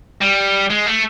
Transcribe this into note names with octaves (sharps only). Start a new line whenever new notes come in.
G3
G#3
A3